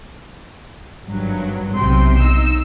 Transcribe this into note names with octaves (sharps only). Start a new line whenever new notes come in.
G#1 G2 F#3
B1 C3 G5 C6
D#4 E6